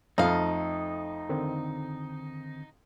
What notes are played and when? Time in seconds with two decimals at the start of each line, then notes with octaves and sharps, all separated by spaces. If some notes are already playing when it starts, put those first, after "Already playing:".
0.18 F2 A3 D#4 F5
1.29 D3 D#3 C4